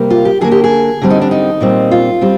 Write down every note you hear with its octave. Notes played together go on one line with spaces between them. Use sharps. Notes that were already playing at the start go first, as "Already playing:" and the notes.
Already playing: C3 G3 A#3
F4
G4
D3 G3 A#3 G#4
G4
G#4
D3 G3 C4
D#4
D4
D#4
A#2 G3 C4
F4
G3 C4